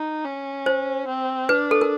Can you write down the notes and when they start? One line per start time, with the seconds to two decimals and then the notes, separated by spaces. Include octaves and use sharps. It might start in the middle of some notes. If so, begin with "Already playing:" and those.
Already playing: D#4
0.25 C#4
0.66 C5
1.08 C4
1.49 D4 B4
1.71 A4
1.81 A#4